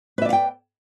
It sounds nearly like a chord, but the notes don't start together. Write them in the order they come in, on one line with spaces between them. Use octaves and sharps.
B4 E5 D5 F5 G5